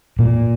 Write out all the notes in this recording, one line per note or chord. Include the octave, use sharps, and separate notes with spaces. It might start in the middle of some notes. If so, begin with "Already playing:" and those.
A#2